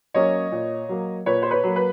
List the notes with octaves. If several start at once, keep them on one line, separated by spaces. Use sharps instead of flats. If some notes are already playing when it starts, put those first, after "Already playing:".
F#3 A#3 C#4 C#5 D#5
A#2
F#3 A#3
A#2 B4 C#5
C5
B4 C#5
F#3 A#3
B4